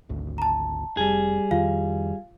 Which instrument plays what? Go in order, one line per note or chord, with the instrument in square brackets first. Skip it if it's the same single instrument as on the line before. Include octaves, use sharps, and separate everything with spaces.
[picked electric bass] G#1 D2
[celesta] A5 A#5
[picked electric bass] F1 [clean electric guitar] G3 G#4
[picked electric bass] F2 D#3 [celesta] F4 F5